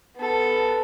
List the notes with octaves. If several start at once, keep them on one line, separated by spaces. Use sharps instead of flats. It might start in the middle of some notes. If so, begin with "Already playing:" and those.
B3 A4